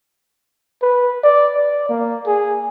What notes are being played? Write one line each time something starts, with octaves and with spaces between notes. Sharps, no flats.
B4
D5
D5
A#3
G#4